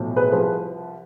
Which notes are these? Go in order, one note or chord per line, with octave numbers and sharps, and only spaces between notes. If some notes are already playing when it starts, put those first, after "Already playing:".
Already playing: B1 A2 F3
G#4 B4
C2 C3 F3 G#4 B4